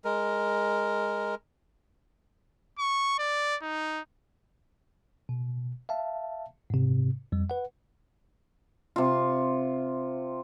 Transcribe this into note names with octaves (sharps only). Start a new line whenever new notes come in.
G#3 A#4
C#6
D5
D#4
B2
E5 F5 A5
G#2 C3
F2 G3
B4 F#5
C3 F4